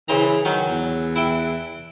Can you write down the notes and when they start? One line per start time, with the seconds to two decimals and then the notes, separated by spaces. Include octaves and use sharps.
0.08 C#3 E3 C5 A#5
0.45 D#3 F#3 G#5
0.67 E2
1.16 E4 E5 G5